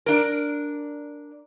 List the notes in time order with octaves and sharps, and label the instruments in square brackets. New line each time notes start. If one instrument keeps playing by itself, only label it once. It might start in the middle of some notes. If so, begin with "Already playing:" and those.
[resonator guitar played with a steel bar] D4 A#4